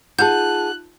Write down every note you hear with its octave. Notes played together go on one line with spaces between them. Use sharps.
D#4 F4 G#4 F#5 A5 F#6 G6